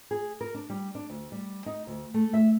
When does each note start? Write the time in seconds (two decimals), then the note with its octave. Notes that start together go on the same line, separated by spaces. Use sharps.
0.11 G#4
0.41 A#4
0.55 D4
0.70 G3
0.95 D4
1.10 D2
1.32 G3
1.66 D#4
1.87 D2
2.14 A3
2.33 E5